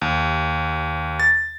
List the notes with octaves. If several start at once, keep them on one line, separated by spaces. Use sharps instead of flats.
D#2
A6